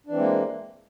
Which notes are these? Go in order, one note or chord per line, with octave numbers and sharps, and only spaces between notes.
E3 G#3 A#3 C4 D4